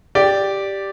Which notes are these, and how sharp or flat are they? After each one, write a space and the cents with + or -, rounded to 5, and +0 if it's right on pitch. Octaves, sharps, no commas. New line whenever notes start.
G4 +0 D5 +0